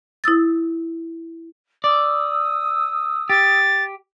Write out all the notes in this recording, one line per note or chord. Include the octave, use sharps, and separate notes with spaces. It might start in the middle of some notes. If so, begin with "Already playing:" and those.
E4 D#6 E6 A6
D5 D#6 E6
G4 A6